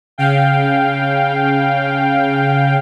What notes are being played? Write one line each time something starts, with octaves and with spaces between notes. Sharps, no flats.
C#3 F5 G5